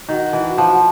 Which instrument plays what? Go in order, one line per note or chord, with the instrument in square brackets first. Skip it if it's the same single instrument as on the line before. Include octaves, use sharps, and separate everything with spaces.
[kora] D#3 [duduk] F#4
[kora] E3
F3